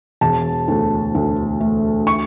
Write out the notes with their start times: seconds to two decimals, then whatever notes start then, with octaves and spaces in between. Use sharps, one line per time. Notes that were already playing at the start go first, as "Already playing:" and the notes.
0.21 E1 A5
0.68 D2
1.15 D2
1.60 A3
2.07 C#6